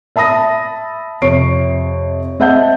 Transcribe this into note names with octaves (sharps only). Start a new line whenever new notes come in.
E5 A5 B5 D#6 A#6
F2 C3 C#5 C#6 C7 D7
C4 D#5 E5 F#5 A5 G6